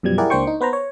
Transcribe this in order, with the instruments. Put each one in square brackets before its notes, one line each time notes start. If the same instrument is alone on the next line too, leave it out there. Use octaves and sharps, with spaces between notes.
[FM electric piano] F#2 B2 F3 G3 G#6
E4 G4 G#4 A#4 D5 F#5
C#2 A#3 D4 C5 G5 C#6
D#4
B3 B4 C5 A#5
C#5